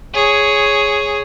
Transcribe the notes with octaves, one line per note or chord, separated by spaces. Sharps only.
G#4 C#5